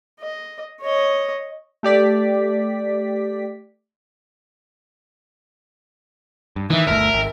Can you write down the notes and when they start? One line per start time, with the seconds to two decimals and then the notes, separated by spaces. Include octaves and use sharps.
0.20 D#5
0.81 C#5 D#5
1.83 A3 G4 D5 B6
6.56 G2
6.70 D#3 E3 E5
6.87 G1 D2 A3 A#4
7.14 G#1